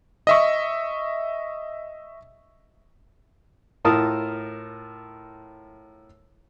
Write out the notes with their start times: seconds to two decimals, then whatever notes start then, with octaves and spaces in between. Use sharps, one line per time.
0.27 D#5 E5 C#6
3.85 A2 F4 A#4 A5 D#6 F6